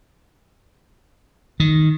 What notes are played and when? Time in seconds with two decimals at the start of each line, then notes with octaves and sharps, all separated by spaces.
1.60 D#3